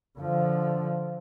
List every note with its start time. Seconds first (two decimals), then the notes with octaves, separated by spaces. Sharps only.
0.19 D3 F3